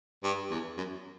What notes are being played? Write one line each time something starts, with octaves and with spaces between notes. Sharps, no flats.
G2
E2
F#2